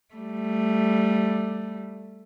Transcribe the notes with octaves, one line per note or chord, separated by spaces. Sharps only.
G3 A3